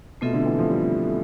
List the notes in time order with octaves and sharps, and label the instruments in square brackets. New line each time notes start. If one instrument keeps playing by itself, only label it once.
[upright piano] B2 [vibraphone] A3 C4 F4 A4 E5
[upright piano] D3
E3
F3
G3